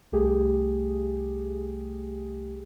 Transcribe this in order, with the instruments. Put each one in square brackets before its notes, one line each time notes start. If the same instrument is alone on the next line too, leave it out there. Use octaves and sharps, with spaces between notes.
[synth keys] C2 A3 G4 G#4